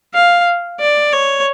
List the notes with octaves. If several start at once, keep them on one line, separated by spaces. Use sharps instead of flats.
F5
D5
C#5